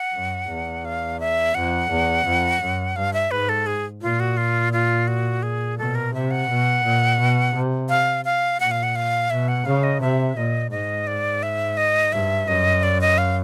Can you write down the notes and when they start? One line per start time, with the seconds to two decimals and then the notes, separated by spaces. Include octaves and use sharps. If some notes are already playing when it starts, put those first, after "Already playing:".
Already playing: F#5
0.14 F#2
0.49 E2
0.85 F5
1.20 E5
1.55 F2 F#5
1.90 E2
2.25 F2
2.61 F#2
2.96 G2 F5
3.13 E5
3.31 G#2 B4
3.49 A4
3.67 G#4
4.02 A#2 F4
4.20 F#4
4.37 F4
4.73 F4
5.08 F#4
5.43 G#4
5.78 B2 A4
5.95 A#4
6.14 C3 E5
6.31 F#5
6.49 B2
6.83 A#2
7.19 B2
7.54 C3
7.89 F5
8.25 F5
8.60 A#2 F#5
8.71 F5
8.83 F#5
8.96 F5
9.30 B2 E5
9.48 F#5
9.65 C#3 F5
9.83 D#5
10.01 C3 E5
10.37 A#2 D#5
10.71 G#2 D#5
11.07 D5
11.43 E5
11.77 D#5
12.12 G2 E5
12.47 F#2 D#5
12.83 D5
13.01 D#5
13.18 F5